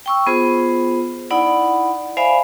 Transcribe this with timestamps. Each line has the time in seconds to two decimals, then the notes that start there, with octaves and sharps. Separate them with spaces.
0.06 G5 C#6 E6
0.27 B3 F4 G#4 C5
1.31 D#4 E4 D5 F#5 B5
2.17 C5 D5 E5 F5 G#5 B5